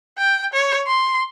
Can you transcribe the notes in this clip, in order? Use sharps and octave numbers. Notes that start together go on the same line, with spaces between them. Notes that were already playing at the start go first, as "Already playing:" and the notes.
G5
C#5
C6